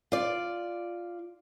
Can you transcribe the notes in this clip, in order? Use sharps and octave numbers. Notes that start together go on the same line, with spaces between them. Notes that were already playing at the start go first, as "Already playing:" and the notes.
F4 D5